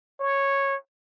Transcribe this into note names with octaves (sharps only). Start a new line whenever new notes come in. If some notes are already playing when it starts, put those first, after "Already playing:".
C#5